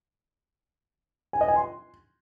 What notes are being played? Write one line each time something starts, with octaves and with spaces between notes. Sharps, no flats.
G#5
D#5
G#5
C6